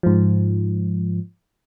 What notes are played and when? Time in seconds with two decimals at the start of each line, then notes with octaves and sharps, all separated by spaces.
0.03 G#2 F3